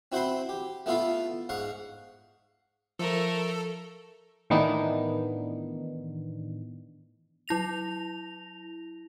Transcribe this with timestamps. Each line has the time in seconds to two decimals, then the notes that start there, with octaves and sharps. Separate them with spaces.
0.12 C4 E4 F#4 C5 B5 C6
0.49 G4
0.86 A3 B3 E4 F4 A4 F5
1.49 G#2 F5 F#5 C#6
2.99 F3 A3 A4 A#4
4.50 A2 D#3 E3 B3 D4 D#4
7.48 F#3 E4 A#6 F7